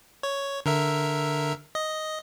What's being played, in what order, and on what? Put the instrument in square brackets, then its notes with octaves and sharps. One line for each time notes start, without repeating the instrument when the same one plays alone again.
[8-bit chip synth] C#5
D3 A#4 E5
D#5